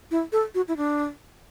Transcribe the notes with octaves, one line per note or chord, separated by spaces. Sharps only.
E4
A4
F#4
E4
D4